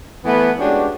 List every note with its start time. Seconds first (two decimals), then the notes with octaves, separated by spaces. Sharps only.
0.24 E3 A3 B3
0.59 G#3 C#4 D4 F#4 G4